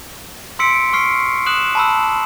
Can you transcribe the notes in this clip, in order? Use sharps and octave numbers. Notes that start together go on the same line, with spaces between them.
C6 E6 B6 C#7 D7
C#6 F6 C7 D7
D#6 F#6 E7 F#7
A5 B5 E6